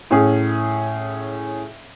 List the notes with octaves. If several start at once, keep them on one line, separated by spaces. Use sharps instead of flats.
A2 C#4 G#4